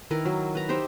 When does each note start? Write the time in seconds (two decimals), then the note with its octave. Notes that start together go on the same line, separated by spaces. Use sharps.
0.11 D#3 E4 A#4 B4
0.25 F#3
0.55 B4 A#5
0.69 D#4 G4 C5 E5